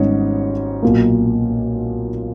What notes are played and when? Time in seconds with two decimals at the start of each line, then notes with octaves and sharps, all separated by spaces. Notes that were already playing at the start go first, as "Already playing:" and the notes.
Already playing: G#1 G#2 G3 B3 C#4 D#4 C#5
0.82 B1 A#2 A#3